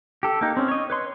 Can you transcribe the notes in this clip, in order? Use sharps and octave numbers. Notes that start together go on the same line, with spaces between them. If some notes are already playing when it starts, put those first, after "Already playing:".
G4 A4
A#3 D#4
C4 C#4
C#5 D#5
B4 C#5 C6